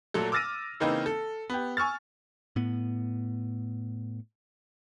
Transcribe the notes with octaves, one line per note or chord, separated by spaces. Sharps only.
A#2 F#3 A3 A4
D6 E6 F6 A6 A#6 D#7
C#3 E3 A#3 C4 D#4 B4
A4
B3 G4
G#5 C#6 E6 F6 A6
A2 B3